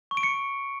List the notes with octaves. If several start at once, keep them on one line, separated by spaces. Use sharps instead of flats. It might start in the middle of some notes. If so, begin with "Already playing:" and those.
C#6
D7
C#7